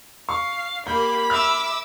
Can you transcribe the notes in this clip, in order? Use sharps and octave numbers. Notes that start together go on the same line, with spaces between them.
F5 C#6
A#3 G4 B5 G6
E5 D6 E6 F6